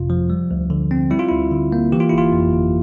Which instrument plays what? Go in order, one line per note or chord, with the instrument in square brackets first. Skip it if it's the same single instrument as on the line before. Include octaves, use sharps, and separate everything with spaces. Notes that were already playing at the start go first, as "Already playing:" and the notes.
Already playing: [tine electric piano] G1 F2 C3 F4
F3
G3
D2
D3
C4
G3 E4
F4
D2 E4
D3
A#3
E3 G4
F4
G1 E4
F4
F2
G1